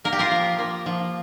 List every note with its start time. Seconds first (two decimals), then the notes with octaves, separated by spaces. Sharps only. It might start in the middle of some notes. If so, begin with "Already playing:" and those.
0.04 A#3 A#4
0.12 G4
0.19 F4 A#4
0.31 F3
0.59 A#3
0.86 F3